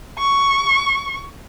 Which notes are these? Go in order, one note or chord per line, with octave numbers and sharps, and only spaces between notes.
C#6